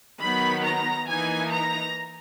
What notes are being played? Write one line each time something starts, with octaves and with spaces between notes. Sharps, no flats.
D#3 F#3 B3 B5
A#5
E3 A#3 D#4 G#5
A#5